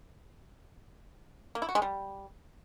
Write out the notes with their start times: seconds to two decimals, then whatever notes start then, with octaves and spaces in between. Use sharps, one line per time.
1.55 A#3
1.62 E4
1.69 F#4
1.75 G#3
1.82 G3